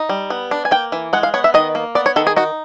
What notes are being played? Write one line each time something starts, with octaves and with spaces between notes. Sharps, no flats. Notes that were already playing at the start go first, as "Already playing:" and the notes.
Already playing: D#4
G3
B3
D4
G#5
A#3 G5
E3
G#3 F#5
F5
B3 C#5
E5
D#3 D#5
A#3
B3 D5
C#5
D#3 A4
G#4
D#4 F#4